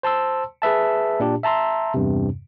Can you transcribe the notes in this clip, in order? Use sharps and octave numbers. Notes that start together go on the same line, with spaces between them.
C5 A5 C6 E6
G#4 B4 E5 A5
A#2 D4 G4
E5 A5 A#5 C6 E6
E2 G2 C3